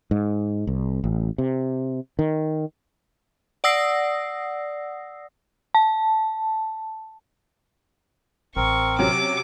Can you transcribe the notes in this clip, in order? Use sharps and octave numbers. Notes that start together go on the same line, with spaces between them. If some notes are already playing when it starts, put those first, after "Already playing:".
G#2
C2
A1
C3
D#3
D5 F#5 D#6 E6 A#6 C7
A5
A1 C4 A#4 C#6
C3 F#3 C#4 D6